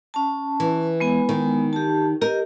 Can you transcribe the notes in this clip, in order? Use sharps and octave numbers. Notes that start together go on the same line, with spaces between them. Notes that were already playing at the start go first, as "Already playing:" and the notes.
C#4 A5
E3
G#3 B3 G#5
D#3
G4 A5
G4 A#4 D#5